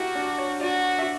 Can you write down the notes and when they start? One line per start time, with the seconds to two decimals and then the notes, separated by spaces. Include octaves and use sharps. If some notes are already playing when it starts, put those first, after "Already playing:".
Already playing: E4 F#4 G4 A#4
0.15 D4
0.38 C#5
0.61 F#4 D5
0.99 E5